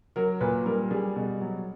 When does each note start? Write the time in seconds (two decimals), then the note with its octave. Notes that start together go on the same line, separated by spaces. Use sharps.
0.16 F#3 A#4
0.41 A#2 B4
0.66 G3 A#4
0.91 G3 G#4
1.16 B2
1.41 F#3